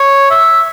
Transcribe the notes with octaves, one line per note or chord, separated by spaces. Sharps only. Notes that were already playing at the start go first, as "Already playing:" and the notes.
Already playing: C#5
E5